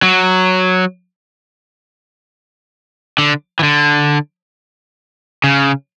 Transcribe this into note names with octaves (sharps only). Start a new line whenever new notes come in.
F#3
D3
E3
D3
C#3